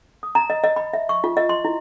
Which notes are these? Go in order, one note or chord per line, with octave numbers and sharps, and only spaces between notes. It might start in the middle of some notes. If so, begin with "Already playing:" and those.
D#6
A#5
D#5
D#5
B5
E5
C#6
F4
D#5
C6
E4